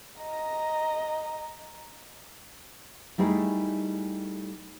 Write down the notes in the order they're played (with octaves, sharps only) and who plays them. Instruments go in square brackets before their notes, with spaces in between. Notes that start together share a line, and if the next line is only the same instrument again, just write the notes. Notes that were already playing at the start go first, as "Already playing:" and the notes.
[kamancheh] D#5 A#5
[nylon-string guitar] G3 A3 D#4 E4 G#4